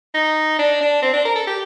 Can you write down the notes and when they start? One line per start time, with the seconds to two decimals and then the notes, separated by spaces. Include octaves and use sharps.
0.15 D#4
0.59 D4
0.81 D4
1.02 C4
1.13 D4
1.25 A#4
1.36 A4
1.47 G4